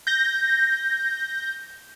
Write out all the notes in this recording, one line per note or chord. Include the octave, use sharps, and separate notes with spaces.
G6 A#6